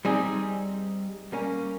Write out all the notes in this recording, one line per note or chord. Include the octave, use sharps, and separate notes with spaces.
G3 C4 D#4 G#4
G3 A#3 C#4